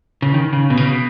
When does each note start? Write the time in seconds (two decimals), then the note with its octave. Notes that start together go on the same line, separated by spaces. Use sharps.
0.22 C#3
0.34 D#3
0.53 C#3
0.70 B2
0.77 C#3
0.85 B2